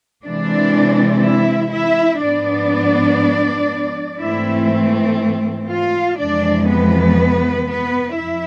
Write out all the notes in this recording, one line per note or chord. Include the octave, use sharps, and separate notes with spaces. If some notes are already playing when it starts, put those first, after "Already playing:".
C3 E3 G#3 C4 D4 D5
E4 E5
E4 E5
G#2 F3 B3 D4 D5
G#2 E3 A3 C4 E4 E5
F4 F5
F2 C3 E3 G#3 D4 D5
B3 B4
B3 B4
F2 E4 E5